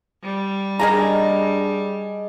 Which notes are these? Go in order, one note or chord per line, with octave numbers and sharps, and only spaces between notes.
G3
D4 G#4 A#4 D#5 G#5 A#5